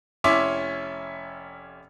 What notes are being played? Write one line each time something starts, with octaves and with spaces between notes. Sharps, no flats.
F1 C#4 E4 E5 C6 D6